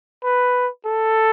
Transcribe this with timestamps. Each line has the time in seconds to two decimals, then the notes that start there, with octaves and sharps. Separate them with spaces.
0.24 B4
0.86 A4